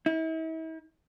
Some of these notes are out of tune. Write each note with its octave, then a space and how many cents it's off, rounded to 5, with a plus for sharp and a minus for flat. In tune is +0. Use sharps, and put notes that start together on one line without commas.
E4 -40